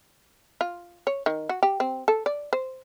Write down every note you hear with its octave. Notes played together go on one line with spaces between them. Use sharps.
F4
C#5
D#3
F#4
G4
C4
A4
D5
C5